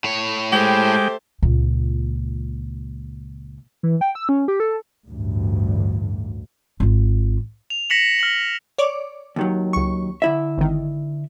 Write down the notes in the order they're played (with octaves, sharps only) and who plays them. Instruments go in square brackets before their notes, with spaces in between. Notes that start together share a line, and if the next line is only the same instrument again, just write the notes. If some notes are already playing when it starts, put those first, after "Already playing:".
[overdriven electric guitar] A2 C#5
[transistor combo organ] G#3 G5 [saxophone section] A3 G4 C5
[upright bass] C#2 A#2
[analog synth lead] E3
G5
E6
C#4
G4
A4
[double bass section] A1 D2 G2
[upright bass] G#1 F4
[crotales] F7
A#6 B6 C#7 E7 F#7
F6 B6 F#7
[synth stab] C#5 D5 D6
[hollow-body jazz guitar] D#2 D#3 F#3
[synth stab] C#2 C#6
[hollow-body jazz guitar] D3 E4 E5
[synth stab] G#1 D#3